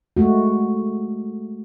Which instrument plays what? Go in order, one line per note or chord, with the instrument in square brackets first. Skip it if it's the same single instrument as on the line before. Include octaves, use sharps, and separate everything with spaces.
[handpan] G#3 A3 F#4